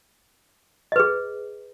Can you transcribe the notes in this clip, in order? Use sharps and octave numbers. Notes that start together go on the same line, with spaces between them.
G#4 B4 D#5